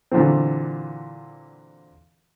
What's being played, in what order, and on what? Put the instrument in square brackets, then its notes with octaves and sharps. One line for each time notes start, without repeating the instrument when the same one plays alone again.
[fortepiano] A#2 D3 E3 F#3 C4